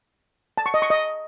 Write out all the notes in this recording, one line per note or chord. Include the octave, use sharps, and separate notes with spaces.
A5
C#6
D#5
C#6
D#5